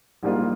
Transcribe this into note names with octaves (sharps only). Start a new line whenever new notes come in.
A#1 G#2 G3 A#3 F4